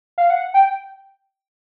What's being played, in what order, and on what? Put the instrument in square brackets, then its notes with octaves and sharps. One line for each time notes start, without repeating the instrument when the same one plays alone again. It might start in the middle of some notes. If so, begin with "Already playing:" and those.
[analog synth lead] F5
F#5
G5